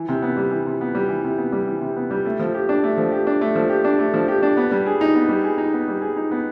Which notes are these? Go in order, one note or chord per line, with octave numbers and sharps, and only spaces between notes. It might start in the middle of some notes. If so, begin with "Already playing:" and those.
Already playing: E3
C3
B3
G3
E3
C3
B3
G3
E3
C3
B3
G3
E3
C3
B3
G3
A3
F3
G4
D4
A3
F3
G4
D4
A3
F3
G4
D4
A3
F3
G4
D4
B3
G3
G#4
D#4
B3
G3
G#4
D#4
B3
G3
G#4
D#4
B3